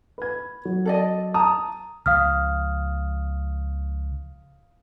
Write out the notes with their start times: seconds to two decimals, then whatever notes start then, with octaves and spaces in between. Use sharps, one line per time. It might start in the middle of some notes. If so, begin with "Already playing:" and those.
0.18 B4 G#6
0.65 F#3
0.85 A4 D5 D#5
1.34 A5 A#5 D#6
2.06 C#2 F3 F5 D#6 F6